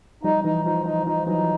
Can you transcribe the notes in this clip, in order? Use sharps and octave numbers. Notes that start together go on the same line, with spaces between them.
F3 G3 D#4
E3 D#4
F3 D#4
F3 D#4
F3 D#4
E3 F#3 D#4